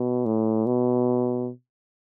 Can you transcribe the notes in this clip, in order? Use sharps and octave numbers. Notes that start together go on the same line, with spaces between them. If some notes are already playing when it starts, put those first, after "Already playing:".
Already playing: B2
A2
B2